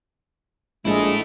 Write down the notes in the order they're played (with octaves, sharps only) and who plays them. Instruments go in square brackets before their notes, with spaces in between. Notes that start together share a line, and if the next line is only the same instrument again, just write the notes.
[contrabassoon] A#1 [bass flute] G#3 [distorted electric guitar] E4 A4